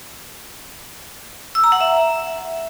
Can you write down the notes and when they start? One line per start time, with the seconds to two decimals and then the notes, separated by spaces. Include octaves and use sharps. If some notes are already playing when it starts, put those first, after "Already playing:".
1.55 E6
1.64 A#5
1.72 F#5
1.81 E5